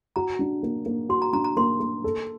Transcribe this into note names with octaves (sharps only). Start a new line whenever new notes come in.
F#4 A#5
D4
A#3
A#3
F#4 C6
A#5
D4 A#5
A#5
A#3 C6
A#3
A4